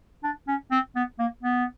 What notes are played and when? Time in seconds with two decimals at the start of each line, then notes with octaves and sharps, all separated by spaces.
0.24 D4
0.48 C#4
0.72 C4
0.96 B3
1.19 A#3
1.43 B3